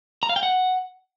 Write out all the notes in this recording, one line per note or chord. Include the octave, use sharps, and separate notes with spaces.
A#5
F5
G5
F#5